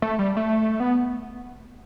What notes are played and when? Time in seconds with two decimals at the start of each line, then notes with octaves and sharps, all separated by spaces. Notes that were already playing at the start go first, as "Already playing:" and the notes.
0.02 A3
0.19 G3
0.37 A3
0.80 B3